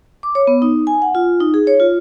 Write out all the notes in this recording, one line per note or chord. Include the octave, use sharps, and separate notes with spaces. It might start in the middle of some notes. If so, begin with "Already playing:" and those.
D6
C#5
B3
D#4
G#5
F#5
F4
D#4
G#4
C#5
F4